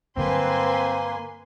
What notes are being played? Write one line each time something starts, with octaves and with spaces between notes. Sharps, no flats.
G2 D3 F#3 A#3 C4 B4 G#5 C6